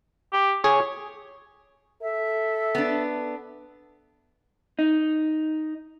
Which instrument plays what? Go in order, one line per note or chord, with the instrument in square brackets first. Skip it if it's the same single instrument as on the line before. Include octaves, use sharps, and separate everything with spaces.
[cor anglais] G4
[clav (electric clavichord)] G#4 [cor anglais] C#5
[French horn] A4 [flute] E5
[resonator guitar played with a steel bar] B3 D4
[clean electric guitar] D#4